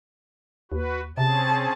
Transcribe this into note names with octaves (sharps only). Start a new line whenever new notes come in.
D#2 F#4 B4
C3 C4 C#4 G#4 A5